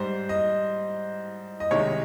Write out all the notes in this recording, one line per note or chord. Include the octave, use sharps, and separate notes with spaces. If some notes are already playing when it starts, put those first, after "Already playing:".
Already playing: G#2 G3 C5
D#5
D#5
C2 C3 D#3 G#3 C#5